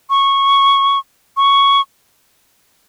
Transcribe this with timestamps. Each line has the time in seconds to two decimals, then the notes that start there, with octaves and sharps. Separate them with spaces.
0.10 C#6
1.37 C#6